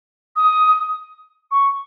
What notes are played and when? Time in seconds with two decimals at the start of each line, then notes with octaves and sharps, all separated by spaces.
0.36 D#6
1.51 C#6